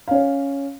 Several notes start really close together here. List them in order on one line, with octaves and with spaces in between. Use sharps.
F5 C#4 C#5